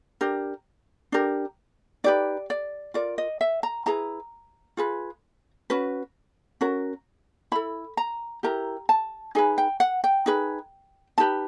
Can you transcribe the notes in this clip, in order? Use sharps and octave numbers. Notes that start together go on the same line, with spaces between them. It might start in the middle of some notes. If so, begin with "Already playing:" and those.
D4 G4 A#4
D4 G4 A#4
D#4 G4 B4 D5
D5
F4 A#4 D5
D#5
E5
A#5
E4 G#4 B4 A#5
F4 G#4 B4
C#4 F#4 B4
C#4 F#4 A#4
E4 A4 B5
A#5
E4 G4 A#4 A#5
A5
D#4 G#4 B4 G#5
G5
F#5
G5
D#4 G#4 B4
D#4 G4 B4 A5